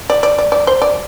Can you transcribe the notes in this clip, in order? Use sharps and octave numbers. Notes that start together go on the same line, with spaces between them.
D5
D5
D5
D5
C5
D5